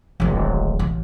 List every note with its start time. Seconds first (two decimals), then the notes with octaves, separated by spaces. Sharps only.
0.20 D1 G#1
0.79 A1